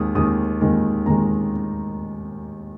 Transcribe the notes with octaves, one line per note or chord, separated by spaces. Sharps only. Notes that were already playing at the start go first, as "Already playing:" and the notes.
Already playing: D#2 D#3 G#3 D#6
D#2 D#3 G#3 D#6
D#2 D#3 G#3
D#2 D#3 G#3 A#5